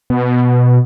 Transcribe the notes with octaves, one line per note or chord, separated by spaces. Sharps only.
B2